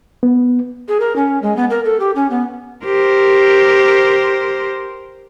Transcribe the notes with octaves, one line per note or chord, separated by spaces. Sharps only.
B3
G#4
A#4
C#4
G#3
B3
A#4
A4
G4
C#4
B3
G4 A#4 C5